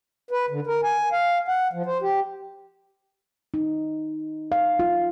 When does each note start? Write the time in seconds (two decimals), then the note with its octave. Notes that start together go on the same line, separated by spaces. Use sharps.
0.31 B4
0.50 D3
0.67 A#4
0.84 G#5
1.12 F5
1.48 F#5
1.73 F3
1.86 C5
2.02 G4
3.54 D#4
4.52 F5
4.79 F4